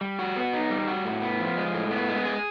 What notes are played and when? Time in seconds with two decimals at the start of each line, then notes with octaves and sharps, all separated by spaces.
0.01 G3
0.19 F#4
0.36 B3
0.53 D#4
0.70 G3
0.88 F#4
1.05 A2
1.22 B3
1.40 F3
1.57 G#3
1.74 A2
1.91 B3
2.08 G#3
2.26 G#4